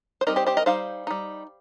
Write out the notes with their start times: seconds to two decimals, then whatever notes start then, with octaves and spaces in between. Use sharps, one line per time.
0.21 C5
0.27 G3 C4 D#4 A#4 D#5
0.36 G4 C5
0.46 G4 C5
0.57 A#4 D#5
0.66 G3 D#4 C5 F5
1.07 G3 D#4